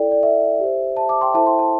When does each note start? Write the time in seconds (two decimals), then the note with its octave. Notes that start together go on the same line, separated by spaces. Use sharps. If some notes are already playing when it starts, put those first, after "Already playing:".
Already playing: E4 A4 D5 G5
0.11 D5
0.23 E5
0.60 G4 C5
0.96 E5 A5
1.09 A5 D6
1.21 G5 C6
1.34 E4 A4 C5 E5 A5
1.47 G5 C6
1.59 E5 A5